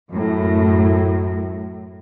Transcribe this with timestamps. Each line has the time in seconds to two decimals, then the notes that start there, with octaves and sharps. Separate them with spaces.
0.10 F#2 A2